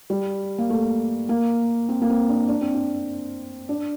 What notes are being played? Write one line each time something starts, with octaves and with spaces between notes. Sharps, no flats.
G3
A#3
A3
A#3
C4
A#3
C4
D4
D4
C4
D4
D4